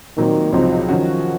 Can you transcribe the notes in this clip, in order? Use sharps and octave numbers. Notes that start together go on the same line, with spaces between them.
A#2 D#3 F#3 C4
C#2 C3 F3 F#3 C4 D#4
D#3 F#3 C#4 F#4